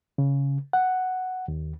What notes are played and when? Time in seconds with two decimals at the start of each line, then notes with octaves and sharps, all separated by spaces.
0.18 C#3
0.73 F#5
1.48 D#2